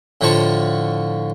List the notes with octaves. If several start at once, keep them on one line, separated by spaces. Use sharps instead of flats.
A2 D3 F3 C#5 A5 C#6